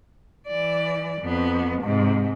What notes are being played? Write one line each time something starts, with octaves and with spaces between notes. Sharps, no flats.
E3 D5
F2 B3
G#2 C3